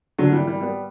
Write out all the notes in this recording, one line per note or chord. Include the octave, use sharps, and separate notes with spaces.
D3 F#3
E3 G3
E3 G3
G3 B3